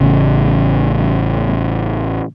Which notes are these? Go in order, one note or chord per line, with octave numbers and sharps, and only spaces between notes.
A1 C#3